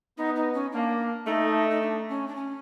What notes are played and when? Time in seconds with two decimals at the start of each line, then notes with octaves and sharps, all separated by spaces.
0.17 B3 D#4
0.35 D#4
0.53 C#4
0.71 A#3 D4
1.25 A3 D#4
1.70 D#4
1.81 D4
2.08 C#4
2.27 D4
2.35 C#4